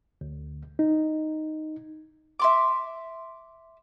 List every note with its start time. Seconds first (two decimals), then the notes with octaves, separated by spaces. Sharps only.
0.21 D2
0.79 D#4
2.39 E5 C6 D6